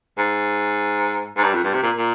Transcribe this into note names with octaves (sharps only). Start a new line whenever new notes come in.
G#2
G#2
G2
F2
G2
C3
A#2
A#2